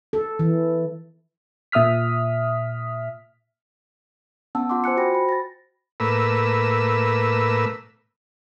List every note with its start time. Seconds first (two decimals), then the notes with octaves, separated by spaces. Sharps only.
0.13 A4
0.39 E3
1.72 A#2 E5 D#6 F6 B6
4.55 B3 C#4 F#5 A5 E6
4.69 F4 F#5 C6 D6
4.84 C5 G#5 F#6 C#7
4.97 F#4 C5 G5 B5 A#6
5.14 B5
5.29 A6 A#6
6.00 A2 A#3 B4 E6